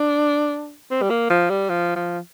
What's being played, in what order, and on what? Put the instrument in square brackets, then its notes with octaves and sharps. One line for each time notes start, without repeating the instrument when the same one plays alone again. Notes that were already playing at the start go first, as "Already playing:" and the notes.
Already playing: [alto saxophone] D4
C4
G3
A#3
F3
G3
F3
F3